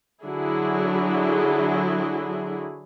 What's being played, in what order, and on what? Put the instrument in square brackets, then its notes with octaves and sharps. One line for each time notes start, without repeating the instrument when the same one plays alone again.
[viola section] D3 F#3 E4 G#4